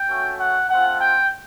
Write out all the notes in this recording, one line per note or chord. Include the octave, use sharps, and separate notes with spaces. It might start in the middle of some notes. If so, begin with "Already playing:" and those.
Already playing: G5
A3 C#4 F#4
F#5
A3 C4 F4 F#5
G5